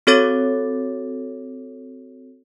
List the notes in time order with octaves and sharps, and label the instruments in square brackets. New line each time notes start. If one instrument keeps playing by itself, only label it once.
[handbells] C4 F#4 A4 C#5 D6 A6